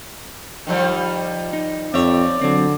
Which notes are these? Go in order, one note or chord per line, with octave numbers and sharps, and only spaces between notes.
D#3 F3 G3
D#4
F2 C4 C#5 D5 E5
D3 F#3 C4